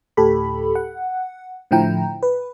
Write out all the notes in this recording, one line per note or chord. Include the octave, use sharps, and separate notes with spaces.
D2 A2 G4 A4 B5
F#5
A2 D3 F3 E4 G5 A#5
B4